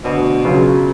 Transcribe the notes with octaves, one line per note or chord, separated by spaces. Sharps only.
D2 B2
C#3 F#3 B3 F4